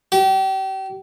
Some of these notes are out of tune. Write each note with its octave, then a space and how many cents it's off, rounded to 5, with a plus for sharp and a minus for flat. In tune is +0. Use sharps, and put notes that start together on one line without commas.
G4 -35